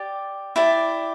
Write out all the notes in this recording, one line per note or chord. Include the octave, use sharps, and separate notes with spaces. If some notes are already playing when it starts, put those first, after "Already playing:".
Already playing: G4 D5
E4 G4 D5